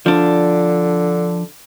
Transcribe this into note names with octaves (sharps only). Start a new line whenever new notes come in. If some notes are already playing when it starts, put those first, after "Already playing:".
D3 F3 D4